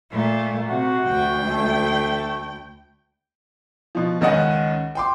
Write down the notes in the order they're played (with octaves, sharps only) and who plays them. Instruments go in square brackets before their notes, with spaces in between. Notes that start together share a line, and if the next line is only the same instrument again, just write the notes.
[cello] A#2 A3
[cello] C3 [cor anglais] F#4
[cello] D2 G5
[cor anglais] A3
[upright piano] B2 F3
C#2 D#3 C#4 D#5 F#5
G5 C6 D6